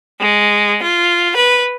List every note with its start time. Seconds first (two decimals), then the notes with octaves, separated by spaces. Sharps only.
0.21 G#3
0.83 F4
1.37 B4